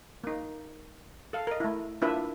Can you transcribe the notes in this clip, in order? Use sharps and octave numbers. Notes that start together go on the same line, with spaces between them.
A#3 D#4
A4 F5
A#4 D#5
A3 E4
A#3 D4 E4 F4 B4 E5